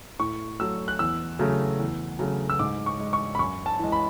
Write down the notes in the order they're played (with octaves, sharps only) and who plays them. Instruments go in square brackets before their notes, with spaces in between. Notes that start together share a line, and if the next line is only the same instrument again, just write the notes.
[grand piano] A2 C#6
F#3 A3 E6
F#6
E2 E6
C#3 F#3 A3
E2
C#3 F#3 A3
E6
G#2 D6
C#6
G#3
C#6
B5
F#2 C#6
A5
E3 G#3
B5